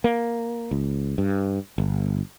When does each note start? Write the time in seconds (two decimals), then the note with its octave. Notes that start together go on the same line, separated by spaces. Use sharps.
0.04 A#3
0.71 C#2
1.18 G2
1.78 G1